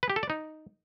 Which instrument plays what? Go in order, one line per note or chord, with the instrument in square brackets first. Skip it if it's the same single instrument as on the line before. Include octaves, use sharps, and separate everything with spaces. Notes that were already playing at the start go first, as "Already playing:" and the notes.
[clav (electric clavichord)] B4
G4
A4
D5
D#4